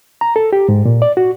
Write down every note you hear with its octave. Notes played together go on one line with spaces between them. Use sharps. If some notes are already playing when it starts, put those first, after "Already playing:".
A#5
A4
G4
G#2
A#2
D5
F#4